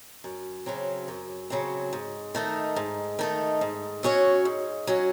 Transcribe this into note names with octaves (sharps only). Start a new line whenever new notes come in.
F#2
C#3 F#3 C4
F#2
C#3 F#3 C4
G#2
D#3 A3 D#4
G#2
D#3 A3 D#4
G#2
F#3 C#4 F#4 C#5
G#2
F#3 C#4 F#4 C#5